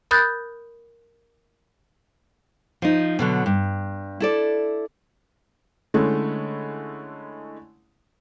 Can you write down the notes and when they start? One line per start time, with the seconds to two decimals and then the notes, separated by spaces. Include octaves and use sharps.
0.11 A#4 B5 D#6 F#6 G6 A6
2.82 F3 D#4
3.19 B2 D3 F#3
3.46 G2
4.20 E4 A4 D5
5.94 D3 G#3 A3 C#4 E4